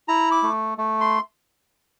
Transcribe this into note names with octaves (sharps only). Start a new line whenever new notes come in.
E4 A#5
D6
A3
A3
C6